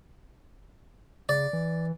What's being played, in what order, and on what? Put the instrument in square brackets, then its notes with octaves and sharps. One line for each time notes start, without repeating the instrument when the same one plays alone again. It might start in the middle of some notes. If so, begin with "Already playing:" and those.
[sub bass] C#3 [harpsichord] D5
[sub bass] E3